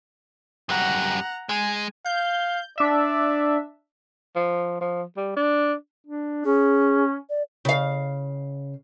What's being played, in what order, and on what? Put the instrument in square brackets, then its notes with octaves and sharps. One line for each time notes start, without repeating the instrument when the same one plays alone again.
[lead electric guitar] F#2 G3 [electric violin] F#5 A#5
[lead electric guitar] G#3 [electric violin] G#5
[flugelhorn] F5 [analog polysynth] G6
[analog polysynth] D4 E5 [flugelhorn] D5
[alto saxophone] F3
F3
G3
D4
[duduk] D4
[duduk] C#4 [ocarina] G#4
[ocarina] D5
[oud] C#3 F5